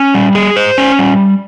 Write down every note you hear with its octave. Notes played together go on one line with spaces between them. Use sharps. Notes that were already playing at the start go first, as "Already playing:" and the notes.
Already playing: C#4
G3
G#4
C5
C#4
G3